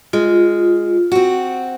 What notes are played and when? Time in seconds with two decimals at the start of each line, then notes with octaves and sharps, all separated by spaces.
0.13 G#3 F4
1.12 C4 F#4